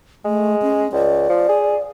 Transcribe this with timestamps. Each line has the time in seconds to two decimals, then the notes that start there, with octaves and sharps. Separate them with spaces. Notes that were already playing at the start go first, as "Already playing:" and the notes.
0.25 G#3 A3
0.62 C#4
0.92 C#2 D5
1.30 F3
1.49 G#4